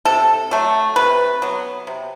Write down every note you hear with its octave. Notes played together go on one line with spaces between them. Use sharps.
C3 A4
F#3 A3
C3 B4
F#3 B3
C3